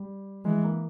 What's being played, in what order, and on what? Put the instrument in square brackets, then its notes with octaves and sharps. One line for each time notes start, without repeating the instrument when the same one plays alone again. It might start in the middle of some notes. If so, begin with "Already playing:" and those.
Already playing: [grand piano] G3
[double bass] E3 [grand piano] G#3
[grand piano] A#3